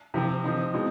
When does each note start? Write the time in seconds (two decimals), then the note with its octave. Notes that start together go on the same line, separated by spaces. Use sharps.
0.14 C3 F3 C4
0.44 F3 C4 D#4
0.74 B2 G#3 C4 D#4